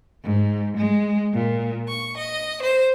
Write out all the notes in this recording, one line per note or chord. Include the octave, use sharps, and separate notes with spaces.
G#2
G#3
A#2
C#6
D#5
C5